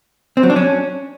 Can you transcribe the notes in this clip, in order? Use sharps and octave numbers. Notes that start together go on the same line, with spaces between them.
C4
F#3
D4
C#4